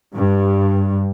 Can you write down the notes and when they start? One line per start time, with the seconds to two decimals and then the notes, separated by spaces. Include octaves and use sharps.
0.15 G2